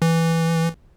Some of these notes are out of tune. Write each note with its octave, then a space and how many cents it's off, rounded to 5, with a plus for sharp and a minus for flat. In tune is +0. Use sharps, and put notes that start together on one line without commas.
E3 +0